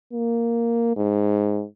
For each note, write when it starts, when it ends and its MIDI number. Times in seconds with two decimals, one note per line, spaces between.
0.13 0.93 58
0.97 1.64 44